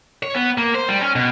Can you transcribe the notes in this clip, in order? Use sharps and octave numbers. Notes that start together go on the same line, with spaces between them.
C#5
B3
A#3
C5
G3
C#4
B2